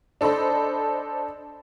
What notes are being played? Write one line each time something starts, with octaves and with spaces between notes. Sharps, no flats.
D4 A4 C5 D#5 B5